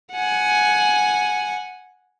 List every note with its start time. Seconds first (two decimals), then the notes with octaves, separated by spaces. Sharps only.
0.12 F#5 G#5